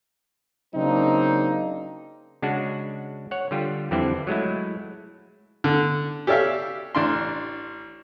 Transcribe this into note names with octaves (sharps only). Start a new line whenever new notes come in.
C#3 F#3 A#3 C4 D4 D#4
C#3 G#3 D4 F#4
C#5 F#5
D3 G3 F4 G4
F2 D3 E3 G3 C4 E4
F#3 G#3 A3 E4
D3
G4 A4 C#5 D5 E5 F5
A1 D4 C6